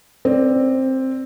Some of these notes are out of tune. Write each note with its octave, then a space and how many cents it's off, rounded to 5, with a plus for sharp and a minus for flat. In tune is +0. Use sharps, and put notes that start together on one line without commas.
C4 +10 D5 +0